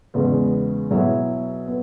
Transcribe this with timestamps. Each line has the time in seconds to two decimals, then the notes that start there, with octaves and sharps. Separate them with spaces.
0.14 E2 C#3 G#3 B3
0.90 B2 F#3 B3 E4 G#4
1.68 B3